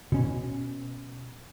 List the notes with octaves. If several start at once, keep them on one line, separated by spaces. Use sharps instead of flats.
B2 C#4